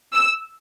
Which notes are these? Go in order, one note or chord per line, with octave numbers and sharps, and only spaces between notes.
E6